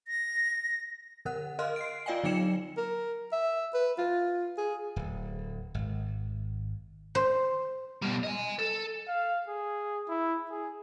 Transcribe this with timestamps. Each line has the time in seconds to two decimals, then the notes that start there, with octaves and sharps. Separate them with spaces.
0.08 A#6
1.25 D3 A#4 F#5 F#6
1.59 A#4 D#5 F5 C6 F6 F#6
1.76 C7 D7
2.06 F4 D5 D#5 F5 G5 G#5
2.24 D3 F#3 D#4 G5 C#7 E7
2.77 A#4
3.32 E5
3.74 B4
3.98 F4
4.58 G#4
4.96 D1
5.74 G#1
7.15 C5
8.02 B2 G3
8.23 D#5 G#5
8.59 A4
9.08 F5
9.48 G#4
10.09 E4
10.50 G#4